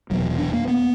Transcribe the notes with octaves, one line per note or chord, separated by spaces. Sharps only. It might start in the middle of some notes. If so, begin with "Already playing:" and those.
F1 E2 B2 F#3
D4
A#3
B3